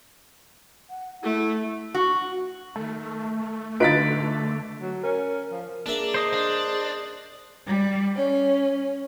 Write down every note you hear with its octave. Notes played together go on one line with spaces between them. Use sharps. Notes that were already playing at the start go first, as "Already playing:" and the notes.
F#5
A3 E4
F#4
D#3 A3
D3 D#4 F4 B4 A6 B6 D7
F#3
C#4 A#4
F3
A#3 D4 G#4 E5
C5 D#5
D4
G3
C#4